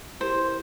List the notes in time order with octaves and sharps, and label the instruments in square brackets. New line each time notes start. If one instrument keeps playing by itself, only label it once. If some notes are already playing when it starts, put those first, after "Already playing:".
[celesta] E4 G4 A#4 [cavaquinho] C5